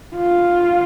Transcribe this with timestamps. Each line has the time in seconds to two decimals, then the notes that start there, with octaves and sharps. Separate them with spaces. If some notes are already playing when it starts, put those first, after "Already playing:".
0.16 F4